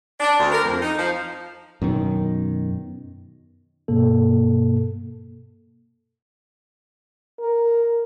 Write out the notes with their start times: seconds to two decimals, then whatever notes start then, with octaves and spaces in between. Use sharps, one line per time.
0.20 D4
0.39 D2
0.52 A#4
0.65 F2
0.82 D#4
0.99 F3
1.82 F#2 B2 D#3
3.88 G2 B2 A#3 A4
7.40 A#4